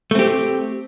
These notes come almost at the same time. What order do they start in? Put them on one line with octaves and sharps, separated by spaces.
A3 C4 G4